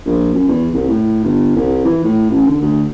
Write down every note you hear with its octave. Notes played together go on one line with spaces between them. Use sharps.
A#1
F#2
E2
C2
A2
G1
C2
E3
A2
A1
D3
D2